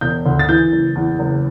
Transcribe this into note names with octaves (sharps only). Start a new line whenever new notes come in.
E1 G6
D2
A6
E3 G6
F#1
E2
F#1